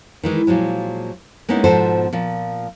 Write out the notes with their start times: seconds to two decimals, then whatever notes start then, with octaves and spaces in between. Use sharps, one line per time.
0.23 D#3 E3 G#3
0.47 A#2 F3 F#3 G#3
1.49 G#3 A#3 B3 C#4 D#4 E4
1.64 G#2 B2 F3 A4 C5
2.13 A#2 F3